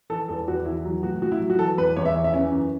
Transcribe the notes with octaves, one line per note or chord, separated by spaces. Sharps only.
E3 A4
E2 A4
E2 F#4
E3 E4
F#3
A2 F#4
A2 F#4
E4
F#3
F#4
E3 A4
E2 B4
E2 C#5
E5
E3
E5
E3 C#4
F#2